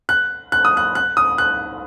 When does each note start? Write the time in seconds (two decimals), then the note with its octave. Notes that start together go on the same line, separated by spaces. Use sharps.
0.09 F#6
0.52 F#6
0.65 D#6
0.77 F#6
0.95 F#6
1.17 D#6
1.38 F#6